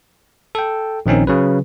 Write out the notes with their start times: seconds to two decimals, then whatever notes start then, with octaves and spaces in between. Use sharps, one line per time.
0.55 A4 G5
1.06 A#1 D#3 C4 C#4 D#4
1.27 C#3 F#3 B4